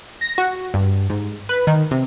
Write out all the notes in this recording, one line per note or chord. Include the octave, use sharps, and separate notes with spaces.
A#6
F#4
G2
G#2
B4
D#3
C3